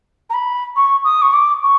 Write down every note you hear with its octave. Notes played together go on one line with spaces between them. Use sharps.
A#5
B5
C#6
D#6
C#6
D6
C#6